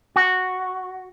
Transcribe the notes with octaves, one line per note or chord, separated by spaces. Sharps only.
F#4